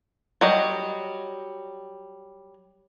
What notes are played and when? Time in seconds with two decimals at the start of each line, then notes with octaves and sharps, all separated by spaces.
0.41 F#3 G3 D#5